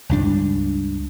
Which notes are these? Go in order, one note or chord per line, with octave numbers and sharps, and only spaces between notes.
C#2 G2 D4